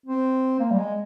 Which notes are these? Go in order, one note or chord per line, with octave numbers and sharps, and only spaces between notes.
C4
A#3
G3
G#3